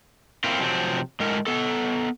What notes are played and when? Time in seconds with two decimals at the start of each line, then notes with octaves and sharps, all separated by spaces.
0.44 A#3 C4 E4 F4
0.60 C3 F3 F#3 C4
1.20 A2 G#3 A#4
1.47 B3 A4